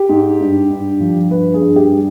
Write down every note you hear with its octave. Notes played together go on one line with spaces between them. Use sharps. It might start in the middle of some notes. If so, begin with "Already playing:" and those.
Already playing: G4
G#2
G2
G2
F3
G2 B4
G#4
G2
G4
G3